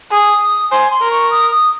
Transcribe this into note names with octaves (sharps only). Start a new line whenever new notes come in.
G#4 D#6
C5 G#5
C6
A#4
C#6
D#6
D#6